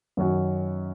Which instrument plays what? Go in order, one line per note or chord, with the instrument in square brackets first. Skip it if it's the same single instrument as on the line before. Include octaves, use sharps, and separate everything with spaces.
[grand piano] F#2 D#3 F#3 C#4 F#4